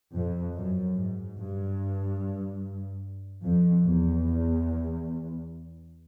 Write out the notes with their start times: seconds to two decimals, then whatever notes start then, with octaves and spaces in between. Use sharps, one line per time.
0.14 F2
0.55 F#2
0.96 G#2
1.37 G2
3.44 F2
3.85 E2